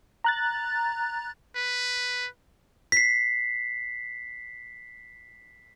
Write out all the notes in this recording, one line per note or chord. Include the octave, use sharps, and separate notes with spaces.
A#5 F#6 A6
B4
B6 C7